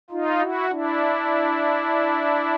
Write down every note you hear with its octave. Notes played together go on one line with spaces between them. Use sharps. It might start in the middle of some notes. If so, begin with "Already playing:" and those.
D#4 F4
E4 F#4
D4 E4